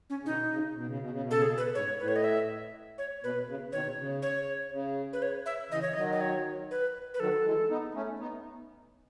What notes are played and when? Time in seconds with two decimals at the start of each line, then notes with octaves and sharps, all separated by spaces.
0.10 C#4
0.21 C#3
0.26 B2 D#3 D#4
0.51 C#3
0.75 B2
0.87 C#3
0.99 B2
1.10 C#3
1.21 B2
1.31 C#3 A4
1.42 B2 G#4
1.58 B4
1.74 G#2 C#5
1.99 A2 B4
2.08 C#5
2.16 D#5
2.24 E5
2.98 C#5
3.23 B2 B4
3.48 C#3
3.72 B2 D#3 C#5
3.97 C#3
4.22 C#5
4.72 C#3
5.13 B4
5.22 C#5
5.46 E5
5.71 C#3 E3 D#5
5.82 C#5
5.94 D#3 F#3 D#5
6.13 D#5
6.21 C#5
6.71 B4
7.14 B4
7.20 D#3 F#3 A4
7.45 E3 G#3
7.69 B3 D#4
7.94 A3 C#4
8.19 B3 D#4